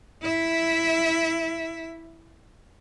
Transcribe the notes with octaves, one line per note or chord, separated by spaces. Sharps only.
E4 E5